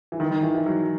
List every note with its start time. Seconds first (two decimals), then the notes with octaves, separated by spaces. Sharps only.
0.12 E3
0.20 D#3
0.31 D#3
0.43 E3
0.55 E3
0.66 F#3